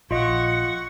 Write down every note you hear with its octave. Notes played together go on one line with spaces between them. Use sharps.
A#1 F4 D#5 F#5 C#6